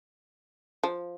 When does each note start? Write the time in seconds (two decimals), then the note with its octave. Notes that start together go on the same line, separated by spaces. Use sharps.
0.84 F3